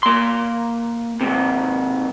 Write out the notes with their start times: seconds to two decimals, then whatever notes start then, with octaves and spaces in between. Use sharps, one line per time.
0.03 A#3 C6
1.21 G#2 C3